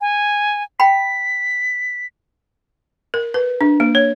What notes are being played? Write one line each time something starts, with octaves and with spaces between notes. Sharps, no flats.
G#5
G5 B5 B6
A#4
B4
D4
A#3
C#5